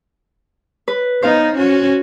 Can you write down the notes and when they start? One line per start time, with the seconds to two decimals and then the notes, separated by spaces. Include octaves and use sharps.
0.88 B4
1.22 B3 D#4 C5 F5
1.56 C#4 F#4